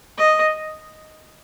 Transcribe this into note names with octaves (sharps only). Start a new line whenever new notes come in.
D#5